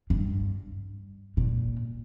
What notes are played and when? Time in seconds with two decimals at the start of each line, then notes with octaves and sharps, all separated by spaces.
0.10 G2
1.37 A#2